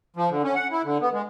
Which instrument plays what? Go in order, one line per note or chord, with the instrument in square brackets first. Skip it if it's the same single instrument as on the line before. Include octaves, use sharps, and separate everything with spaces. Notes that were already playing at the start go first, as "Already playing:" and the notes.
[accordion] F3
D3
C#4
F#5
E4
D3
B3
G#3